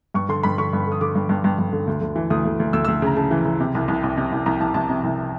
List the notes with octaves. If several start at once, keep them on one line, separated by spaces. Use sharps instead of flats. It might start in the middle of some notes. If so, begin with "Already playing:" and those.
G2 C#6
D3 C6
G2 B5
D3 C#6
G2
D3
D#6
D3 D6
G2
G2
G2
G2
D3
D2
D2
E3
D2 D#6
D2
D2
D2 E6
E6
D2
C#3 A#5
C#3 A5
E3
C#3
C3
C2
C2
C2
C3
C2
C2 A#5
C2 A5
C2 A5
C3
C2